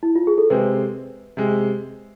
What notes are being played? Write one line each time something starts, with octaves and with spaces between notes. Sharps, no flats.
E4
F4
G#4
A4
C3 G#3 C4 B4
C3 G#3